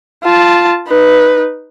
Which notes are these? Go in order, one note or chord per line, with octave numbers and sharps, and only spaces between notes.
F4 A5
D#4 B4